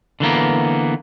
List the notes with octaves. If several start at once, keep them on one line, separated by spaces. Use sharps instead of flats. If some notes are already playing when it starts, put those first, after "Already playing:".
D3 E3 A#3 B3